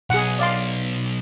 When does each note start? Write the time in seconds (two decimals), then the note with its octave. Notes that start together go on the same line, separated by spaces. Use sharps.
0.10 B1 G#4 F#5
0.39 D5 F5 C6